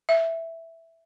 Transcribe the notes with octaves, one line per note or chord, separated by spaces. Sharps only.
E5